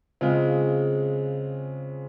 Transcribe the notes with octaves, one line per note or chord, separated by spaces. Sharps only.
C#3 G#3 C4 F4